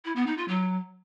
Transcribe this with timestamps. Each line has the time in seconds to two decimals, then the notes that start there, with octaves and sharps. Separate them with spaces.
0.04 E4
0.15 B3
0.26 D#4
0.37 F4
0.48 F#3